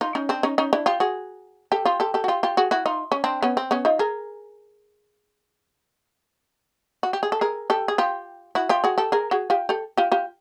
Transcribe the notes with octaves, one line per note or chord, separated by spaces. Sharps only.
D#4 F4
C#4 D#4
C4 D4
C#4 D#4
C#4 D#4
D4 E4
F4 G4
F#4 G#4
G4 A4
F4 G4
G4 A4
G4 A4
F#4
F4 G4
F4 G4
F#4 G#4
E4 F#4
D#4 F4
C#4
C4 D4
B3 C#4
C4
B3 C#4
D#4 F4
G#4 A#4
F#4
G4
G#4
A4
G#4 A#4
G4 A4
G#4
F4 G4
E4 F#4
F4 G4
F#4 G#4
G4 A4
G#4 A#4
F#4 G#4
F4 G4
G4 A4
F4 G4
F4 G4